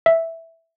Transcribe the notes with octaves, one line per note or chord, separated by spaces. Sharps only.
E5